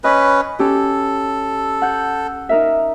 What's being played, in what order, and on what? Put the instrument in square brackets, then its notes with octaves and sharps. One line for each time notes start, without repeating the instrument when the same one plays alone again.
[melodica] C#4 B4 [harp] D#5 B5
[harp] C#4 G4 [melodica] A4
[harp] F#5 G6
D#4 A#4 E5